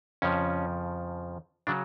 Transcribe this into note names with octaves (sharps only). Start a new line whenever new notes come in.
F2 C#3 F3 C#4
C#3 F#3 D4